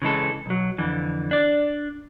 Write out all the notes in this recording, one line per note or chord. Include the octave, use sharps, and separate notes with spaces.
C#3 E3 G#3 A4
B1 F#3
F2 D3 E3
D4 D5